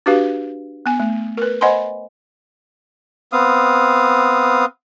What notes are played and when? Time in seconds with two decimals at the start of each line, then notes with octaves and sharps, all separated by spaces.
0.06 D4 F#4 G4 B4 F5
0.86 B3 G#5
1.00 A3
1.37 A#4 B4
1.61 C5 D#5 F#5 G#5 B5 C6
3.33 B3 C4 F5 D#6